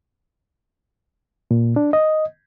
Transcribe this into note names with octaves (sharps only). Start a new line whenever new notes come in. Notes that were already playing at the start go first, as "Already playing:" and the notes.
A#2
D4
D#5